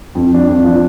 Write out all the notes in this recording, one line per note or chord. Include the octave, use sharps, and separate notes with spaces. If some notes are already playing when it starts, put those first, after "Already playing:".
F2
F3 D4
F2
F3 D4